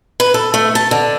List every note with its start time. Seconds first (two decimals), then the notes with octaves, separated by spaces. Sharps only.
0.20 B4
0.34 A4
0.54 A3
0.75 A5
0.91 D3